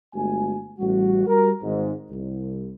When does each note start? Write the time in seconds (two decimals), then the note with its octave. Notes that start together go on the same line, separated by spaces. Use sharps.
0.14 G1 G#3 A3 F#4 G#5
0.79 A1 G3 F#4
1.27 G3 F#4 A#4
1.63 G#1 G#2
2.11 C2